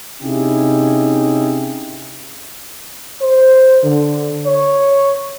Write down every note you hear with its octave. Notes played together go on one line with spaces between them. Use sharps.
C3 C#4 D#4 E4 G4 G#4
C5
D3
C#5